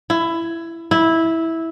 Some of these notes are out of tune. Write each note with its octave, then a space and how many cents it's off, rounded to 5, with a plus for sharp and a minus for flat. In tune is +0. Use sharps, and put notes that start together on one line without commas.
E4 +15
E4 -10